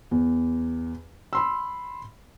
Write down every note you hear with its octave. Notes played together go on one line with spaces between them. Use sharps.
E2
B5 C6 E6